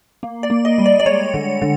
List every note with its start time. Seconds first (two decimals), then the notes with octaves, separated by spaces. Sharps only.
0.23 A#3
0.43 D5
0.50 A#3
0.65 D#5
0.78 G3
0.86 D5
1.00 D5
1.06 G#3 C#5
1.34 D3
1.62 D3